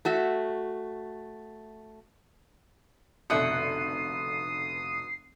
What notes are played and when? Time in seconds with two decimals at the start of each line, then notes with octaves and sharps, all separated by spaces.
0.05 A3 F#4 E5
3.30 F1 B2 D3 E5 D#6 F#6 C7 C#7